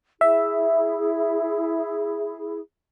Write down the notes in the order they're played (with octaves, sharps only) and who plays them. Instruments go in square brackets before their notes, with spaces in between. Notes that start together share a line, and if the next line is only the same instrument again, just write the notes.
[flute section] E4 G#4 [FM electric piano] E5